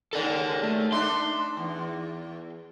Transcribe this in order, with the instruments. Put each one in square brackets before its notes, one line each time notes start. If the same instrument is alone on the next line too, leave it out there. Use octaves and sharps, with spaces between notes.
[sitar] D#2 G#3 A#4 [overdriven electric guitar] A4 D5
[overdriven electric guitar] A3
[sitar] D4 D#4 E5 [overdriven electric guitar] C6
[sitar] E2